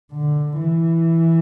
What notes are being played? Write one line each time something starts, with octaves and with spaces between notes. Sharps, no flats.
D3
E3